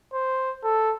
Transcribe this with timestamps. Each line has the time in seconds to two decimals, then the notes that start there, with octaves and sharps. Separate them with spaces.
0.13 C5
0.64 A4